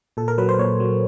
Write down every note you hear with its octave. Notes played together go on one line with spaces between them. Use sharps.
A#2 A4
A#4
F#3 B4
C5
A#2 C#5
F#3